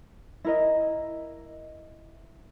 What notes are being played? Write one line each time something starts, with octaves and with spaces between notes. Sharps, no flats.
E4 A#4 D#5